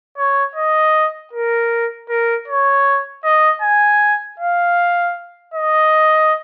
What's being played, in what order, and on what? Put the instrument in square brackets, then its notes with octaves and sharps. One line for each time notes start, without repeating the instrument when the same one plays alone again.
[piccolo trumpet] C#5
D#5
A#4
A#4
C#5
D#5
G#5
F5
D#5